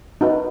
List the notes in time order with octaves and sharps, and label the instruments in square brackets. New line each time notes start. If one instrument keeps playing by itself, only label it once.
[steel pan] D#4 F#4 B4 E5